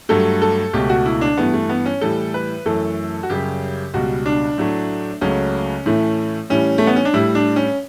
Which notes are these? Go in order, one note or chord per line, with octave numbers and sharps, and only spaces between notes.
G2 F#3 A3 A4
A4
C#2 B2 A3 G4
F#4
E4
D4
G2 E3 A3 B3
A3
B3
C#4
A2 E3 G3 A4
B4
F#2 E3 A3 A4
F#4
F#2 C#3 G3 G4
C#2 B2 G3 F#4
D4
A2 F#3 A3
C#2 C#3 F#3 A3 C#4
A2 E3 A3
A2 E3 G3 C#4
A3
B3
C#4
D4
A2 G3 E4
D4
C#4